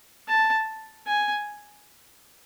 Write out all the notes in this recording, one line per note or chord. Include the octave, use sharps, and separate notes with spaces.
A5
G#5